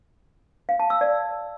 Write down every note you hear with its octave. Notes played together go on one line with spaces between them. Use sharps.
F5
A5
E6
D5